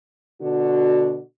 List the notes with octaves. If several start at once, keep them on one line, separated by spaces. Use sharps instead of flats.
B2 D3 D4 F#4